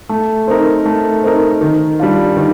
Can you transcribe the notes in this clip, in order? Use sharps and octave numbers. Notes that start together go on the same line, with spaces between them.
A3
C4 D#4 A#4
A3
C4 D#4 A#4
D#3
G3 D4 F4
D#3